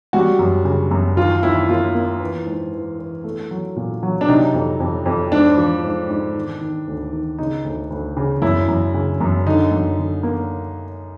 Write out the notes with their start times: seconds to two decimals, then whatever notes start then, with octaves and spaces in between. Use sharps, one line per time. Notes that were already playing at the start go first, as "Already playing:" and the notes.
0.13 G3 F#4
0.39 F#2
0.65 C#3
0.91 F#2
1.17 D#2 F4
1.43 D#2 E4
1.69 A#3 F4
1.95 A#3
2.20 E3
2.46 G#2
2.73 E3
2.99 E3
3.24 A3
3.51 F#3
3.76 A#2
4.03 F#3
4.21 D4
4.28 C3 D#4
4.54 F2
4.80 F2
5.06 F2
5.32 G#2 D4
5.57 F3
5.83 G#2
6.09 G#2
6.35 D#3
6.61 D#3
6.88 D2
7.13 D#3
7.38 C#3 D#4
7.65 D2
7.90 D2
8.17 C#3
8.42 F#2 E4
8.68 F#2
8.94 C#3
9.21 F#2
9.46 D3 D#4
9.71 F#2
9.98 D3
10.23 A#3